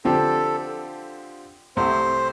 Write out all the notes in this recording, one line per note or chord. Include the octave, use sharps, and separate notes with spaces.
D3 F3 C4 G4 A4
C2 C3 A3 C4 G4 C5